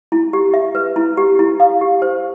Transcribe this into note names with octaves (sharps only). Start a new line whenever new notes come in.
E4
G4
E5
B4
E4
G4
E4
F5
G4
C5